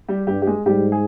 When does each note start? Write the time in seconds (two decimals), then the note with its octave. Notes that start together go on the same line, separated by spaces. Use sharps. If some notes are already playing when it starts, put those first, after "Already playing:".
0.08 G3 G4
0.27 G2 G3 G4
0.42 G4
0.47 G#3 G#4
0.66 G#2 G3 G4
0.92 G#4